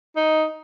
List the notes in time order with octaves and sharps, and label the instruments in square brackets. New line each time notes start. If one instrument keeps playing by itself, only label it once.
[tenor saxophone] D#4